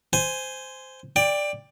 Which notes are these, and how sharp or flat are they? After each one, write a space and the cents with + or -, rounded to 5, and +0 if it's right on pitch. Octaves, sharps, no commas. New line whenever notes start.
C5 -10 G#5 +0
D5 +0 G5 +20